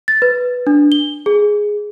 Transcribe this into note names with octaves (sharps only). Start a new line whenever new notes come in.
A6
B4
D4
G7
G#4